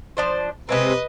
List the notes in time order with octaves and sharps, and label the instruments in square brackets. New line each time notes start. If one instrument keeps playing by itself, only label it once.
[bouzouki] F3 D4 C5
[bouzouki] C3 G#3 C4 [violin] B4 D#5